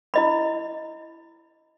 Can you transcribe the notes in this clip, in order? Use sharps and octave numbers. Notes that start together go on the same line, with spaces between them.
E4 D#5 B5